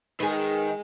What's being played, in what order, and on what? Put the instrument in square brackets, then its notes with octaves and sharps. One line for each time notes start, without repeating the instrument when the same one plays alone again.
[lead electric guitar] D#3 [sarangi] G#3 [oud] G#4 B4